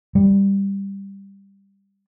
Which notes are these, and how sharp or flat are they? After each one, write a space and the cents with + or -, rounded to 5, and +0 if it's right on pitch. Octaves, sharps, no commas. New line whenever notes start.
G3 +10